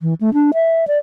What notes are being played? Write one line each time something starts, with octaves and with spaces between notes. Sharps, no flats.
E3
A3
D4
E5
D5